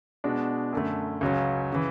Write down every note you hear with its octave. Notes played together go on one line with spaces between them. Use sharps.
B2 G#3 D4 F#4
F#2 D3 A3
C#2 C#3 F#3 C#4
C#3 E3